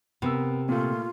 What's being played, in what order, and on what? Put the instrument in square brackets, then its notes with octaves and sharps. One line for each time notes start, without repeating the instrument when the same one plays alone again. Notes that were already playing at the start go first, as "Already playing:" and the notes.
[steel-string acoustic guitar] C3 [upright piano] B3 A#4 E6
[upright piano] A#2 A3 [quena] F4